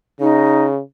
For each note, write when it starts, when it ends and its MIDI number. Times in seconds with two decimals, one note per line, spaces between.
0.20 0.80 49
0.20 0.64 63